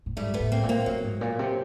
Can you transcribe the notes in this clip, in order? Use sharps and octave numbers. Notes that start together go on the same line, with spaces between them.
A2
G#2 G3 A3
A3 B3
A2
A#3 C4
A#2
A#3 C4
A2 F#3
G#2
A#2
C3